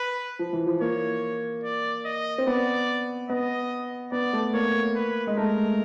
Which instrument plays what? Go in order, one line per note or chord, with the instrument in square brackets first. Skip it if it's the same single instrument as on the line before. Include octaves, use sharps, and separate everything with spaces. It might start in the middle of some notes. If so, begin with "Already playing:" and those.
Already playing: [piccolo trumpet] B4
[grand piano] F3
E3
F3
[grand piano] A#3 [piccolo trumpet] C#5
[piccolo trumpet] D5
D#5
[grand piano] C4
[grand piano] B3 [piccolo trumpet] D5
[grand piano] B3 [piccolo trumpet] D#5
[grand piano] B3 [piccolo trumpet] D5
[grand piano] A3
[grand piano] A#3 [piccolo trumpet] C#5
[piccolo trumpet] B4
[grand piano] G#3
[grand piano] A3 [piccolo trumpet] A#4